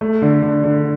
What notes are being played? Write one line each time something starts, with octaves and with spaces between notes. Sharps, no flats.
A3
D3
D3
D3